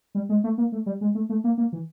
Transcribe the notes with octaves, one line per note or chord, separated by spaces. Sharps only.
G3
G#3
A3
A#3
A3
G3
G#3
A3
A3
A#3
A#3
E3